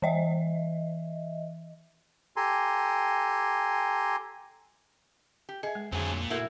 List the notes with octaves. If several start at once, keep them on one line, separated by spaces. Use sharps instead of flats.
E3 D#5 E5
G4 A4 G#5 A#5 C6
G4
G#4 D#5 E5
G#3
F2 D3 F#3 C4 G#4
A#2
E4 F#4 A4 A#4 E5